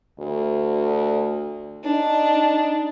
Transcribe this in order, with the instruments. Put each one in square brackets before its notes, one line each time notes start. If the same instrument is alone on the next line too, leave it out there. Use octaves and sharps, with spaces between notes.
[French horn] D2
[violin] D4 [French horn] D#4